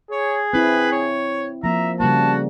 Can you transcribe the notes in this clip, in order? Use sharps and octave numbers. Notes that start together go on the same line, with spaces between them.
G#4 C#5
C4 E4 B4
C#5
F3 A#3 E5 A#5
C#3 G3 A#3 F#4 A5